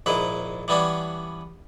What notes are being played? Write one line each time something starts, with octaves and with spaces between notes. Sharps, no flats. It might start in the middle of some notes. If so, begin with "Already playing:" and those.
A#1 G#2 D#3 E4 B4
E3 G3 B3 C#4 D4